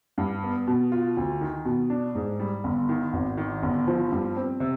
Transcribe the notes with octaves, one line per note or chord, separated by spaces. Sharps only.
G2
B3
B2
F4
D2
D#3
B2
D4
G#2
G3
G1
D#3
G#1
D#3
G1
F3
G2
C4
C3